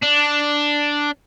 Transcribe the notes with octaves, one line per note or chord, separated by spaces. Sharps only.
D4